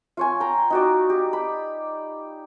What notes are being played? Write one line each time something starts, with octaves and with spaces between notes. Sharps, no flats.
F4 C#5 G#5
G5 A#5
D#4 F#4 D5
G4
B5